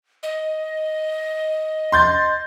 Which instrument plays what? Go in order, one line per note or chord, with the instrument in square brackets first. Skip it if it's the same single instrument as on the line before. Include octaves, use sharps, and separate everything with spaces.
[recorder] D#5
[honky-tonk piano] C6 G6 A6